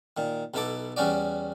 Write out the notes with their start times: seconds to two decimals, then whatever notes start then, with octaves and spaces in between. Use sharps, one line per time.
0.17 A#2 D#3
0.54 B1 B2 E4 A4 A5 D6
0.97 E2 G3 C#4 F#4 D5